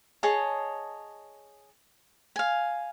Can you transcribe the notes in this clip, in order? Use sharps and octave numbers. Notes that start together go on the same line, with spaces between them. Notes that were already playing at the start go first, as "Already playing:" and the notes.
G#4 C#5 D#5 A5
F5 G#5